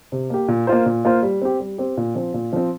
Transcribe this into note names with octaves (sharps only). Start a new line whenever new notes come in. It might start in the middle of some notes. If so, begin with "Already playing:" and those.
C3
A#3 G4
A#2
A#3 F4 C5
A#2
A#3 F4 C5
G3
C4 G4
G3
C4 G4
A#2
F3 C4
A#2
F3 C4